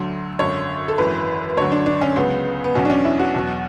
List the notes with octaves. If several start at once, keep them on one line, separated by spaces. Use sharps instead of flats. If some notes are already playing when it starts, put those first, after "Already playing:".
Already playing: D2 D3 F#3
G#1 F#2 D3 C#5
A4
G#1 F#2 E3 B4
D2 D3 F#3 C#5
D4
D4
C#4
C#2 C#3 F#3 B3
B3
E2 B2 F#3 C#4
D4
C#4
E4
F#4
E2 B2 F#3